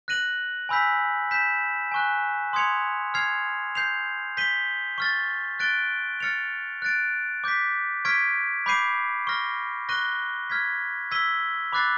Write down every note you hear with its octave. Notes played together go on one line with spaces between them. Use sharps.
F#6 A#6 D#7 F#7
G#5 B5 E6 G6 B6
G6 B6 E7
G#5 C#6 F#6
C6 D#6 G#6 C#7 F7
F6 G#6 C7 F7
G6 C7 F7
G6 B6 D#7 G7
C#6 F6 A6
F#6 A6 D7 G7
F6 A6 C#7 F7
F#6 A6 D7
D6 G6 B6
C#6 F6 G#6 B6 D7
B5 D6 G6 C7 D#7
C#6 F6 A#6
C#6 F#6 A#6 D#7 G7
F6 G#6 B6
E6 G#6 B6 D#7 G7
B5 D6 F#6 A6 C7